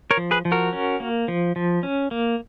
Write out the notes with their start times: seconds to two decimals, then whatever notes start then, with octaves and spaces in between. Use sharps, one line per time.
0.11 A#4 C#5
0.17 F3
0.31 G#4 B4
0.45 F3
0.52 F#4 A#4
0.73 C#4
1.00 A#3
1.28 F3
1.56 F3
1.83 C#4
2.11 A#3